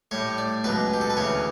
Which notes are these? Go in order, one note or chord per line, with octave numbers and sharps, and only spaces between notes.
A2 G3 C#5
D5
C#2 B2 F#3 B4
G4
A4
B4
D2 C#3 E3 C#5